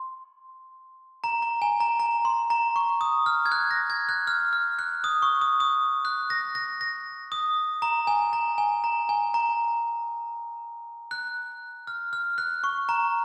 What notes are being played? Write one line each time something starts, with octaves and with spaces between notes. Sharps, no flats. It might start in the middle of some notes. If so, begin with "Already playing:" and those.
Already playing: C6
A#5
A#5
G#5
A#5
A#5
C6
A#5
C#6
D#6
F6
G#6
F#6
A#6
G#6
F#6
F6
F6
F#6
D#6
C#6
D#6
D#6
F#6
A#6
A#6
A#6
D#6
A#5
G#5
A#5
G#5
A#5
G#5
A#5
F#6
F6
F6
F#6
C#6
A#5